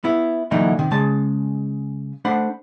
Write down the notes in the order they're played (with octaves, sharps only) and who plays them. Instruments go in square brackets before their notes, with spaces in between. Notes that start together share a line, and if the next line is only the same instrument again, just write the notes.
[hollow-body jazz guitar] B3 E4
D3 E3 F#3 A#3 D#4 E4
C3 D#3
C#3 G#3 A5
A3 D4 C5 F#5 B5